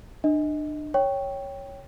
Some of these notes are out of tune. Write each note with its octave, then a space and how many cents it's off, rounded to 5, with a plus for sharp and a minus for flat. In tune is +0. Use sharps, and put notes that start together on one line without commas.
D4 +35 D#5 +20
C#5 +0 G5 +0 C#6 +0